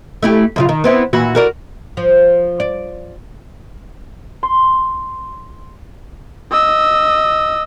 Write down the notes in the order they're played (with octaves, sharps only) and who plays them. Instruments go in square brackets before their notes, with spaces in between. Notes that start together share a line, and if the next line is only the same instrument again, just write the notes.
[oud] A3 E4 G4
F#2 C#3 F4
D#3
B3 C4 E4
A#2 E3 F#4
F#4 A#4 D5
F3
D5
[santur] C6
[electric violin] D#5 E6